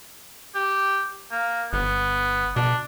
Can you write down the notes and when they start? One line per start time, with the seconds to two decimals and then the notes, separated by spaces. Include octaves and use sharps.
0.55 G4
1.31 A#3
1.73 G1 B3
2.56 B2 D4